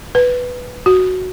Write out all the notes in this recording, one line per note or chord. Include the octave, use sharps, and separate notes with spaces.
B4
F#4